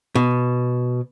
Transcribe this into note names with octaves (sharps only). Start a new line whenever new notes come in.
B2